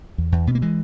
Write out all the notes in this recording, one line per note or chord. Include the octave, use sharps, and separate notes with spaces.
E2
E2
B2 B3
A#3
E3 G#3